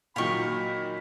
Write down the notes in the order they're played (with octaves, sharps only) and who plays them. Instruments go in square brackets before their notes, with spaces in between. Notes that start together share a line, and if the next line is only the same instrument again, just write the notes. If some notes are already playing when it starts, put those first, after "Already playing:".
[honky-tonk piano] A#2 D#3 F#3 [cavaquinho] F5 G5 C#6 [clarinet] B5